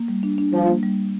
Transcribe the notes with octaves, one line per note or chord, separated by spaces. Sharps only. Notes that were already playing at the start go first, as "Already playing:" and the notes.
Already playing: A#3
G3
D4
D4
F3 G3
A#3
G3